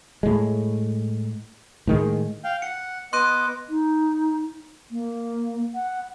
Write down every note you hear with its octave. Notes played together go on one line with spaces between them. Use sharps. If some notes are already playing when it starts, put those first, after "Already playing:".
A2 G#3
A2 D#3 G#3
F5 G5
F#5 C#7
B3 D#5 C6 D6 F#6 D#7
D#4
A#3
F#5